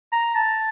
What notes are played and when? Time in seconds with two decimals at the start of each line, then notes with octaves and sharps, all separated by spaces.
0.13 A#5
0.35 A5